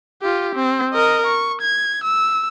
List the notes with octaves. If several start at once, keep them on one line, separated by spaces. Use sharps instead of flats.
F4 G4
C4
A#4 D#5
C#6
G#6
E6